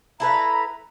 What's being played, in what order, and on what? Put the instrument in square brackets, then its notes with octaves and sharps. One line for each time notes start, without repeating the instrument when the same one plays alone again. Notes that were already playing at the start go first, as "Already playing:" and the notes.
[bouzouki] E4 A4 B4 [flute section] A#5 B5